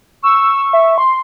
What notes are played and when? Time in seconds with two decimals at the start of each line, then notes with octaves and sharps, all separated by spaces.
0.23 C#6 E6
0.73 E5
0.98 C6